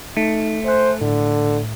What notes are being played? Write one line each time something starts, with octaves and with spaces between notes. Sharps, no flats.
A3 D#4
C5 E5 G#5 F#6
A2 D3